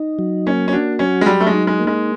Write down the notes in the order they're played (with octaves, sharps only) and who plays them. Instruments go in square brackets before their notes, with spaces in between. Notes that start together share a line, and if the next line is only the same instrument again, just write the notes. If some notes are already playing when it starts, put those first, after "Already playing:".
Already playing: [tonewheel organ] D#4
F#3
[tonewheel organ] A#3 [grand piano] C#4
[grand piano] C#4
[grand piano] D4 [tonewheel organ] F#4
[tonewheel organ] F#3 [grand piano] C#4
[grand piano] G#3
[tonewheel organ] F#3 [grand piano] G3
[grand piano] A3
G#3
[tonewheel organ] D#4
[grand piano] G#3
[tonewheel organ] A#3
[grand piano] G#3